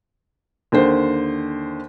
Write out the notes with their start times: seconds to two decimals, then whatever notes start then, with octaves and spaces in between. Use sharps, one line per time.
0.72 D#2 D3 C5